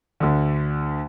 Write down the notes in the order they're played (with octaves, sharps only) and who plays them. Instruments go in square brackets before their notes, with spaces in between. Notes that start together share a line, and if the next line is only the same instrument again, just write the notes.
[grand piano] D2 D3